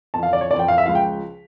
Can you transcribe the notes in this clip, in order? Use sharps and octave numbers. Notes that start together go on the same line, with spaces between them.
F2 E3 A5
F5
D5
C#5
F2 E3 D5
G5
F5
E5
C#2 C#3 F3 F5
G5